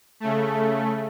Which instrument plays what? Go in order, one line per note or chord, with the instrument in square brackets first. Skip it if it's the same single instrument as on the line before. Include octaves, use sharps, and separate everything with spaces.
[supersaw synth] C#3 A3